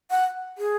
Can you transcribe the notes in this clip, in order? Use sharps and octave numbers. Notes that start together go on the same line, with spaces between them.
F#5
G#4